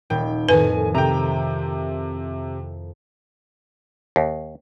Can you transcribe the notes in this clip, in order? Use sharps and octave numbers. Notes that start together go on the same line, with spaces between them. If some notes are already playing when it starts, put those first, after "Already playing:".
D#1 G5
F2 A2 D#3 B4 G#5
C3 G5 A#5
D#2